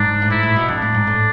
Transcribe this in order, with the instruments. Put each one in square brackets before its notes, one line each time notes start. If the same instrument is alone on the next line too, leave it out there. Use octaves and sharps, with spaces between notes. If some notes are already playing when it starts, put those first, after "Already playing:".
Already playing: [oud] G#2 [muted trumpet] D4
[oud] A2
[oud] G#2 [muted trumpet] E4
[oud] A2
B2
[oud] F2 [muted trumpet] D4
[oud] A2
G#2
A2